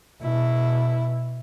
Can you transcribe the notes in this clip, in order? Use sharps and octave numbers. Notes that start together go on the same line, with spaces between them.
B2 E4